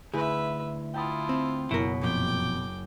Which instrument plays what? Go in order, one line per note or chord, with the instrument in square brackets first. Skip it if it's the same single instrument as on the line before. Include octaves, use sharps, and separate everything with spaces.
[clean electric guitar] D2 [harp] E4 [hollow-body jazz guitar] G#4 [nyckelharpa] B4 E5
[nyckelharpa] E4 F4 [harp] G5 A5 D#6
[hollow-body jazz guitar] C4
[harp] F#1 B6 [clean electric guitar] B2 [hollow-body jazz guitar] E4 A#4
[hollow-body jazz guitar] F2 A#2 [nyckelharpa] G5 D6